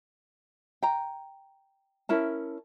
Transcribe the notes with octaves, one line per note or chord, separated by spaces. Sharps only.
G5 A#5
C#4 E4 A#4 A5